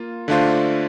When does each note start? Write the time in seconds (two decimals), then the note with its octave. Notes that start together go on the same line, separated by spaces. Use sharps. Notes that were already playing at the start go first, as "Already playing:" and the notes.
Already playing: A#3 F4
0.28 D3 A3 D4 F4 C5